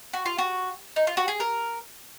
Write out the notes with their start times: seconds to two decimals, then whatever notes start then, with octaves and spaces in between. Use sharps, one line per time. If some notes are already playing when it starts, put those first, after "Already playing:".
0.13 F#4
0.26 F4
0.38 F#4
0.96 D#4
1.07 F4
1.17 F#4
1.28 G#4
1.40 A#4